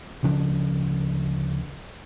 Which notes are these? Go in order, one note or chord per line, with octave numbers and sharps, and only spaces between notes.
D2 C#3 F3 D4